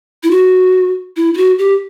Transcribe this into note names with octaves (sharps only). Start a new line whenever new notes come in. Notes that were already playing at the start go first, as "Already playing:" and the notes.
E4
F#4
E4
E4
F#4
G4